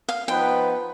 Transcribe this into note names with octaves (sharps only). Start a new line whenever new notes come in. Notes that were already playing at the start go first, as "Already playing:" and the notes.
F5
F3 B3 D#4 B4 G5